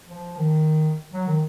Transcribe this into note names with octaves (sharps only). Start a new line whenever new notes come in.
F3
D#3
F#3
D#3